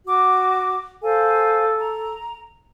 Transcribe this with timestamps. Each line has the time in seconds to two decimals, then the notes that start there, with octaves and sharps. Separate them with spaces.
0.06 F#4 D6
1.02 A4 C5 F5 G#5
1.80 A#5